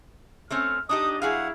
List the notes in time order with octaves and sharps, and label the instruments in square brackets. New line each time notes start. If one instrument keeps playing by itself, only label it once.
[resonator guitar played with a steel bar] A3 C4 C#4 [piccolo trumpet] F6
[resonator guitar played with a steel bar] D4 D#4 G4 [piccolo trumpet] D#5 [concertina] D#6
[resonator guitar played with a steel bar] F#3 G#4 F5 [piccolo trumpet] E4 [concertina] F#5